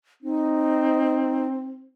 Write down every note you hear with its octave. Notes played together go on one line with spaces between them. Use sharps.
C4 D#4